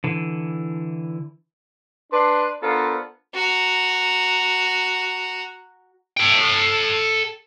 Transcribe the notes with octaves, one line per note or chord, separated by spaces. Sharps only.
D3 E3
D4 B4 C6
B3 D4 F4 A4 A#4 C5
F#4 A#5
A4 G5